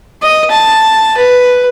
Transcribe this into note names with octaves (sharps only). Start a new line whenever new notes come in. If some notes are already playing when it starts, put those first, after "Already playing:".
D#5
A5
B4